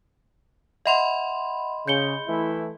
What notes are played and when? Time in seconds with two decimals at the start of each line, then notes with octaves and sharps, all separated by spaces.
0.86 D#5 E5 F#5 B5 C6 F7
1.88 C#3 G6 C#7 G7
2.28 E3 A3 E4